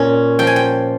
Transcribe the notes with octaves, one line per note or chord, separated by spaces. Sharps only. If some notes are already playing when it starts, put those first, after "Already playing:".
Already playing: A#2 C#4
F3 G5
G#5
G5